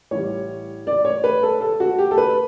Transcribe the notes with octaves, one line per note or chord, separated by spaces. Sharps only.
A1 A2 E3 G3 C#5
D5
C#5
B4
A4
A4
F#4
G4
A4
B4